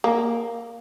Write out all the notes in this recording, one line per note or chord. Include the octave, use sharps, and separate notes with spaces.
A#3